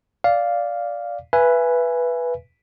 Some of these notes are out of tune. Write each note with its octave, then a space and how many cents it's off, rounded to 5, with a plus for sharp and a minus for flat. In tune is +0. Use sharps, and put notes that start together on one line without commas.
D5 -10 F5 +0
B4 -5 E5 +30 G#5 +0